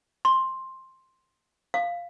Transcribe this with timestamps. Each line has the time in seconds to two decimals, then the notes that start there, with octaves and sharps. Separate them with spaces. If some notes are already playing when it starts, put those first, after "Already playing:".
0.25 C6
1.74 F5